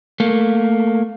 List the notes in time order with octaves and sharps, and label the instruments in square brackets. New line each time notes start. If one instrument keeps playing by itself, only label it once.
[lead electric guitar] A3 A#3